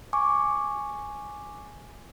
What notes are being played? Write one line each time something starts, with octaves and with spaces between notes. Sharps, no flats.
G#5 C#6 D6